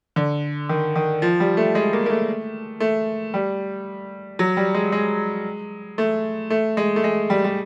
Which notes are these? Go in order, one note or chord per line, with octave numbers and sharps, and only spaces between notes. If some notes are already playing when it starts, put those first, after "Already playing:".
D3
D#3
D#3
F3
G3
A3
G#3
A#3
A#3
A3
A3
G3
F#3
G3
G#3
G#3
A3
A3
G#3
A3
G#3
G3
G3